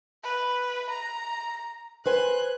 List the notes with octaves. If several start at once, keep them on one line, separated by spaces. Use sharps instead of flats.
B4
A#5
B4 C5 G#5 F#6